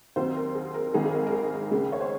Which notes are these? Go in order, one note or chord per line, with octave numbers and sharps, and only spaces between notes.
D#2 D#3 F#3 C4 C5
A#4
G#4
A#4
G#1 G#2 D#3 G#4
G#4
A#4
A#4
G#4
C#2 C#3 G#3
C#5
C5